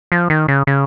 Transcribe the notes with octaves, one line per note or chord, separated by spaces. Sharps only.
F3
D#3
C#3
C#3